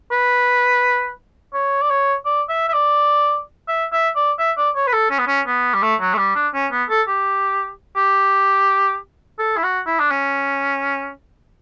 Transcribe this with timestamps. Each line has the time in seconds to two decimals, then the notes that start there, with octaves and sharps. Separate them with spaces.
0.11 B4
1.54 C#5
1.82 D5
1.90 C#5
2.25 D5
2.49 E5
2.69 E5
2.73 D5
3.68 E5
3.93 E5
4.15 D5
4.39 E5
4.57 D5
4.75 C#5
4.87 B4
4.93 A4
5.10 C#4
5.19 B3
5.27 C#4
5.47 B3
5.74 G3
5.83 A3
6.01 F#3
6.14 A3
6.18 G3
6.35 D4
6.54 C#4
6.72 B3
6.89 A4
7.08 G4
7.96 G4
9.39 A4
9.57 E4
9.63 F#4
9.86 E4
9.99 D4
10.11 C#4